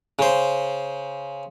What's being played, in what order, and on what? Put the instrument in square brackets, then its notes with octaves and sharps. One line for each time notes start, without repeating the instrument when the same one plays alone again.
[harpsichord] C#3 C5